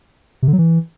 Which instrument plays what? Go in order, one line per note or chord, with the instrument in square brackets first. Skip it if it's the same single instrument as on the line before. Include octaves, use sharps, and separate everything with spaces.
[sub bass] C3
D3
F#3
E3